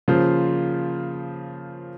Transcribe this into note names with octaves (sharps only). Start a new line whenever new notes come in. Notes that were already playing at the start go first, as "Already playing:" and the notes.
C#3 F3 A#3 F4 C5